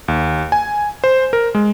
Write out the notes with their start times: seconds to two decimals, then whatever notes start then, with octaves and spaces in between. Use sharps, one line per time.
0.08 D#2
0.52 G#5
1.04 C5
1.33 A#4
1.55 G#3